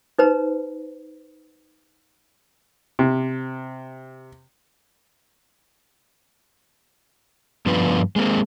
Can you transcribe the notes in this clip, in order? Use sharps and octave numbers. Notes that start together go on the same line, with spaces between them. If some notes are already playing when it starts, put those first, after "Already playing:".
D#4 B4 C5 A#5
C3
G2 F3 B3 D4 F4 B4
G#3 A#3 C4